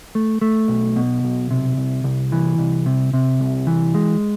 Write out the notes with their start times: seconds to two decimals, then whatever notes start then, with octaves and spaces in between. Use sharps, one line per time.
0.15 A3
0.41 A3
0.68 B1
0.96 B2
1.24 B1
1.51 C3
1.77 C2
2.04 C2
2.32 E3
2.58 C2
2.86 C3
3.13 C3
3.40 C2
3.67 E3
3.94 G#3